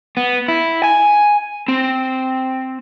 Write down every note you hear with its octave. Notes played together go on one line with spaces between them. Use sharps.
B3
E4
G#5
C4